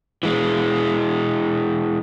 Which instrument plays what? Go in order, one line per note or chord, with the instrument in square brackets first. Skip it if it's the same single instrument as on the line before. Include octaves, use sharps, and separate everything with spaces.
[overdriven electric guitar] E3 G#3